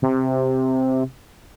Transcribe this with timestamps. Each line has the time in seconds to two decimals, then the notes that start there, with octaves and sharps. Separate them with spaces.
0.02 C3